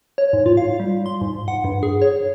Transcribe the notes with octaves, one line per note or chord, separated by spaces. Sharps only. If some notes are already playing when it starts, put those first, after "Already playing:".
C#5
G#2
F4
F5
G3
C6
G#2
F#5
G2
G#4
C#5